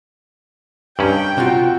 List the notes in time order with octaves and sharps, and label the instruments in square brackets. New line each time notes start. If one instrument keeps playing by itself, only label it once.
[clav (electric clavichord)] G2 C#4 [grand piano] D#5 A#5 F#7 [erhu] G5
[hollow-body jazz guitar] C3 F4 [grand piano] F#4